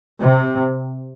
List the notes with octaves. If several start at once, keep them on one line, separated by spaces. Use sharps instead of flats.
C3